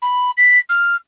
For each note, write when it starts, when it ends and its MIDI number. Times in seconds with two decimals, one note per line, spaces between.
0.02 0.31 83
0.37 0.59 95
0.69 0.96 89